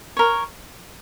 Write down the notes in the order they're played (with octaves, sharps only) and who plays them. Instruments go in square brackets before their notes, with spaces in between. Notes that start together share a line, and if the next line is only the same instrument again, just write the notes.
[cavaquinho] A#4 C#5